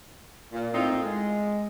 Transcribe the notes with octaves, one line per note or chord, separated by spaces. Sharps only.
A#2
A2 C4 D#4 F4
G#3